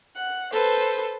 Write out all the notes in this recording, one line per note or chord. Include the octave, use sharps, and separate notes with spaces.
F#5
A4 B4 C5